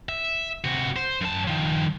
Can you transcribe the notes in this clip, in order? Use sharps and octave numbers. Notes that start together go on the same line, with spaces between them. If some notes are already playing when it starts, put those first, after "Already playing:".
E5
C3 F#4
C5
F#2 A5
D#3 F3